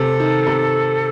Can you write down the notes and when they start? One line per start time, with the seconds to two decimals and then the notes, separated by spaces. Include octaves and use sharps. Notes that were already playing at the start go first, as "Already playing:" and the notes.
Already playing: C3 A4
0.20 D#3
0.46 C3